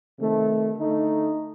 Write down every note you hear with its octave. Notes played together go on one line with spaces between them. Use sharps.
C3 D#3 A3
D3 A3 D#4